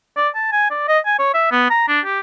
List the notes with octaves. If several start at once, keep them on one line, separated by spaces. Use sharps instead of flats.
D5
A5
G#5
D5
D#5
G#5
C#5
E5
B3
A#5
D4
G4